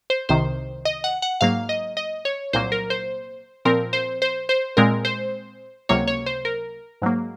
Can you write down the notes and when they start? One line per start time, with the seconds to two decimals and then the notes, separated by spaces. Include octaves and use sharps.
0.10 C5
0.29 C2 C3 D#3 C5
0.85 D#5
1.04 F#5
1.22 F#5
1.41 G#2 F#3 A#3 F5
1.69 D#5
1.97 D#5
2.25 C#5
2.53 C2 A#2 F#3 A#3 C5
2.72 A#4
2.90 C5
3.65 A#2 F3 C4 A#4
3.93 C5
4.22 C5
4.49 C5
4.77 A#2 G#3 C4 A#4
5.05 C5
5.89 C#2 C3 F#3 A#3 C#5
6.08 C#5
6.26 C5
6.45 A#4
7.02 G#2 F#3 A#3